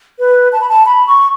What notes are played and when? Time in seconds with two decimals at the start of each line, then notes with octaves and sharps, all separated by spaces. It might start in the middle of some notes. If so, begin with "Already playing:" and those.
0.19 B4
0.52 A5
0.61 B5
0.69 A5
0.86 B5
1.07 C#6